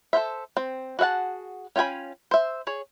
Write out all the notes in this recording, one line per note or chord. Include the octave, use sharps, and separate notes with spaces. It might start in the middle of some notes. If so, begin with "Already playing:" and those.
A4 A#4 C5 E5
C4
F#4 G#4 E5 F#5 A5
C#4 F4 G5 G#5 B5
C5 E5
G#4 C#5